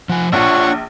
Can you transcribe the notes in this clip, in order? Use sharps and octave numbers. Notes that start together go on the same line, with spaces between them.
F3 F#5 G#5
A#1 D4 F4 C#5 F#5 C#6